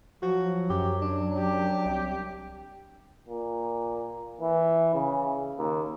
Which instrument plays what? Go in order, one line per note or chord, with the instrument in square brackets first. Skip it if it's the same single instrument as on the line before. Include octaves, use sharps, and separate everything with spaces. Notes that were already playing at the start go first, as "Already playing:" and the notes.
[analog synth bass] F3 [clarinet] F#3 [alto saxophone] F#4
[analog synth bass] F#2 [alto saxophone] G4
[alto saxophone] D4
[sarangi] G4
[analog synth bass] C2
[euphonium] A#2
E3
C#3
D#2